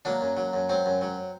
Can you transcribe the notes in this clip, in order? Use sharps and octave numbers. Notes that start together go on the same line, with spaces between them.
F#3 A#3 D4
F#2
F#3
F#2
F#3 C4
F#2
F#3